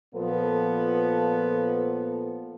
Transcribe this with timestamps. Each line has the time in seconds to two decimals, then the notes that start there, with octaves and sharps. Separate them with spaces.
0.14 A#2 F3 B3 A4